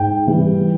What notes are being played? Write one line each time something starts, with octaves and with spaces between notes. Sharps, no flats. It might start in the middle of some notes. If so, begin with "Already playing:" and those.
Already playing: G#2 G5
E3 G3